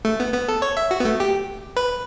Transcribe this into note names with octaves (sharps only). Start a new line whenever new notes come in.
A3
B3
B3
A4
C#5
E5
F#4
B3
A3
G4
B4